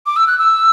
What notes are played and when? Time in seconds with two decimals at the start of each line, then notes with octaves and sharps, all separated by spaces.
0.06 D6
0.16 E6
0.27 F#6
0.39 E6